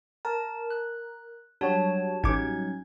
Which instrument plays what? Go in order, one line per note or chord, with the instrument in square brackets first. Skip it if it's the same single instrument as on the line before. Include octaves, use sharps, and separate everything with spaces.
[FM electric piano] A#4 [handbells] A5
[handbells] F#6
[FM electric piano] F#3 G3 F#4 [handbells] D4 C#5 A5
[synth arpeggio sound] A1 D6 [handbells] C#4 D#4 G#6